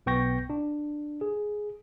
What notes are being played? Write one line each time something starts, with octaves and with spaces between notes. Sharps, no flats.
B1 B3 G5 C#6 G6 A#6
D4
G#4